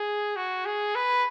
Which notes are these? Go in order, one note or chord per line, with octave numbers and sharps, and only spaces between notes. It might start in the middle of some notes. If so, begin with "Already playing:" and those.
Already playing: G#4
F#4
G#4
B4